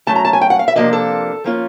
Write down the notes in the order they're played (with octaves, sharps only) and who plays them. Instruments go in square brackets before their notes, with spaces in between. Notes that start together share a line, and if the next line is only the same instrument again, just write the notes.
[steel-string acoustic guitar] F#3 A3 C#4 A5
A#5
A5
G#5
G5
F#5
F5
E5
C3 F3 A#3 D4 D#5
A4
F3 A#3 C#4 F4